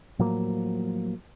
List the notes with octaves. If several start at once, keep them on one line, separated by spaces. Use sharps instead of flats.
A2 F3 F#3 A#3